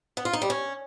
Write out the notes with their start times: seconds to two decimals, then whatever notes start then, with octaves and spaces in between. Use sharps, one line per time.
0.17 B3
0.25 F4
0.33 D#4
0.42 G3
0.50 C#4